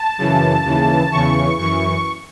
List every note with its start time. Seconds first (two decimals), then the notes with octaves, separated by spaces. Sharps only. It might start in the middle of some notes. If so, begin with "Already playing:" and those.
Already playing: A5
0.18 F#2 C#3 E3
0.65 D#2 C#3 E3
1.12 E2 C#3 E3 C#6
1.58 F#2 E3 C#6